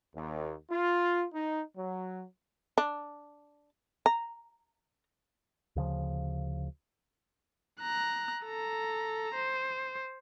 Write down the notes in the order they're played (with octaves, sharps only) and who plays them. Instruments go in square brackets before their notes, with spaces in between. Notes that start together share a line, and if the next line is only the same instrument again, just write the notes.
[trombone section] D#2
F4
D#4
F#3
[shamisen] D4
A#5
[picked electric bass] D2 C#3 F3
[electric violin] A#5 F#6
A4 A#5
C5